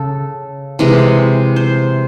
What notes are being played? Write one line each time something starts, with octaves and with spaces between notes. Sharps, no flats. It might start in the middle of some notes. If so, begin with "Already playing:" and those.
Already playing: C#3 A4
C3 E3 G#3
C5